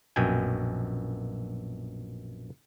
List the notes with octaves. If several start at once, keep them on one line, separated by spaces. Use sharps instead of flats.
A#1 F#2 B2 G5 G#5